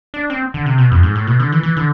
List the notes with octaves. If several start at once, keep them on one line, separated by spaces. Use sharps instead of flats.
D4
C4
D3
C3
B2
F2
G#2
A2
B2
D3
E3
E3
D3